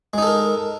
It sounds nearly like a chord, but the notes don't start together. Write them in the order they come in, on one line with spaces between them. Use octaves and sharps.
G#3 D#4 A4 A#4